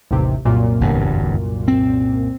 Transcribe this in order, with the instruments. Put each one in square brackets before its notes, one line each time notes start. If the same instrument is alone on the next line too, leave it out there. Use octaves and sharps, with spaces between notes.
[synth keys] A1 D#2 C3
C2 F#2 A#2
[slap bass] G1 E2 G2
C4